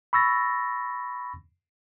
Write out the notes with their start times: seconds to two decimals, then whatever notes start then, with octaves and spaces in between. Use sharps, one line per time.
0.13 B5 C#6 E6 A6 A#6